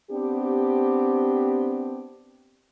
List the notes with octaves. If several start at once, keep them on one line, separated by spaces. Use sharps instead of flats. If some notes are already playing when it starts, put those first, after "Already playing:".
B3 C4 D4 G4